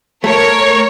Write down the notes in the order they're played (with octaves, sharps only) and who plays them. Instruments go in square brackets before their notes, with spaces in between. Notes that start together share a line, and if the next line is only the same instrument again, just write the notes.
[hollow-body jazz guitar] A3 [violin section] A#4 C#5